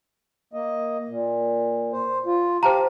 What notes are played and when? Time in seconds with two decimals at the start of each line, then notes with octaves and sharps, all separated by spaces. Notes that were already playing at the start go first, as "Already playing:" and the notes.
0.53 A#3 D#5
1.08 A#2
1.92 C5
2.26 F4
2.63 G4 C5 F5 A5 A#5